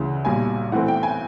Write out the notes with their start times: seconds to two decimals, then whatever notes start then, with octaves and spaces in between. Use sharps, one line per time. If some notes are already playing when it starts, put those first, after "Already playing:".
Already playing: D2 C#3 E3
0.25 B1 A#2 G3 G#5
0.72 A2 E3 A3 C4 F#5
0.88 G5
1.03 G#5